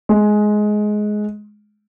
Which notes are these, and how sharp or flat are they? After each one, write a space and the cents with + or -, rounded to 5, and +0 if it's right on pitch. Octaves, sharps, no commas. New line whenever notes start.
G#3 +15